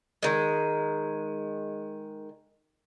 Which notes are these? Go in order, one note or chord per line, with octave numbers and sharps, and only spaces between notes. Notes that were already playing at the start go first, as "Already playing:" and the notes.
D#3 G#3